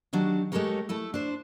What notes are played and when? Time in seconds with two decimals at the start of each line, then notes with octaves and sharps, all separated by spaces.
0.13 D#3 F#3 D4 F#4 G4
0.52 G#3 A3 G4 A4 A#4 C#5
0.89 A3 E4 A4
1.14 D4 C5